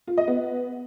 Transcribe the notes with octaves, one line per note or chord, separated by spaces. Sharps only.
F4
D#5
B3